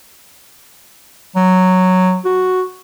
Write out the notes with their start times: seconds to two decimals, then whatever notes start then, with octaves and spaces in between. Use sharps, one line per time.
1.36 F#3
2.25 F#4